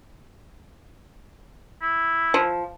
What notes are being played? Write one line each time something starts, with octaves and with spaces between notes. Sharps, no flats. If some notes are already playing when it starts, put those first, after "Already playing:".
E4
F3